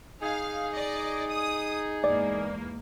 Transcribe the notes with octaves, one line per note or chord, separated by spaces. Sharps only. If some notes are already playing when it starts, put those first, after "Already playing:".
D#4 G#4 F5
D5 D#5
D#6
E2 G#2 A#3 D5